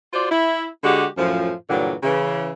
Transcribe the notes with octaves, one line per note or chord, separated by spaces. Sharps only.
F4 F#4 C5 D5
E4
D3 G#3 F#4 G4
F#2 A2 F3
G2 A#2 D3 E3 F#3
C#3 E3